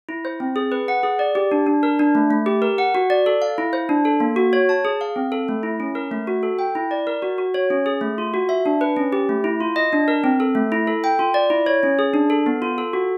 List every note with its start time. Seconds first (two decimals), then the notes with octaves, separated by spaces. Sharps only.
0.09 E4
0.25 C5
0.40 C4
0.56 G#4
0.72 B4
0.88 F#5
1.03 G#4
1.19 D5
1.35 G4
1.51 D4
1.67 D4
1.83 A#4
1.99 D4
2.15 A3
2.31 A3
2.46 G4
2.62 A#4
2.78 F#5
2.95 F#4
3.10 D5
3.26 A4
3.42 F5
3.58 E4
3.73 C5
3.89 D4
4.05 A4
4.20 A#3
4.36 F#4
4.53 C#5
4.69 A5
4.85 G#4
5.01 F5
5.16 C4
5.32 A4
5.48 A3
5.63 E4
5.80 C#4
5.95 A#4
6.11 A3
6.27 F#4
6.43 A4
6.59 G5
6.75 E4
6.91 D5
7.07 A#4
7.22 F#4
7.38 F#4
7.54 C#5
7.70 C#4
7.86 G#4
8.01 A3
8.18 F4
8.34 F#4
8.49 E5
8.66 D4
8.81 B4
8.96 C#4
9.13 G4
9.29 A3
9.44 E4
9.61 F4
9.76 D#5
9.93 D4
10.08 A#4
10.24 C4
10.40 A4
10.55 A3
10.72 E4
10.87 A4
11.04 G5
11.19 F4
11.34 D5
11.50 E4
11.66 C#5
11.83 C#4
11.99 G#4
12.14 D4
12.30 A4
12.46 B3
12.62 F4
12.78 A4
12.93 F#4